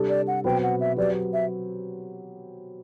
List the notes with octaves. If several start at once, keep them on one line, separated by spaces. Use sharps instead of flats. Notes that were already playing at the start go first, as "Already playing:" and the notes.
Already playing: C3 G3 D4 A4
D5
F#5
B2 F#3 C4 F#4 B4 G5
F#5
E5
F#3 C4 G4 B4 D5
E5